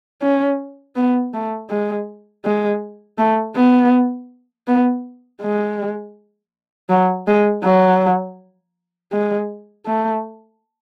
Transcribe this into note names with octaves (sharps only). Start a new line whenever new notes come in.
C#4
B3
A3
G#3
G#3
A3
B3
B3
G#3
F#3
G#3
F#3
G#3
A3